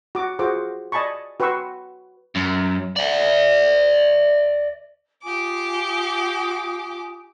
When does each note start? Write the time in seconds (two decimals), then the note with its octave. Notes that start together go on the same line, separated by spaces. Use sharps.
0.15 F#4 D6
0.39 F4 F#4 G#4 C5 D6
0.92 D5 D#5 G#5 A5 B5 C#6
1.40 F#4 B4 G5 C6 C#6 E6
2.36 F#2
2.96 D5 E5
5.24 F4 G4 G#5 D6 D#6